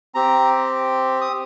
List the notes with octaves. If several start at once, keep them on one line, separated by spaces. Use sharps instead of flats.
C4 G4 A#5
D#6